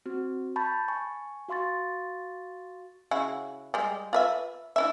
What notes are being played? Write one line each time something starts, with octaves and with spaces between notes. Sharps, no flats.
C4 F#4
A5 B5 C#6 G6 A6
G#5 C#6
F#4 F5 C6 C#6 A6
C#3 E4 F#4
G3 G#3 G4
F4 B4 E5
D4 E4 E5